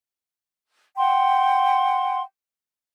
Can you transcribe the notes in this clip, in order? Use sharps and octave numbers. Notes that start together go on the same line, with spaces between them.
F#5 G5 C6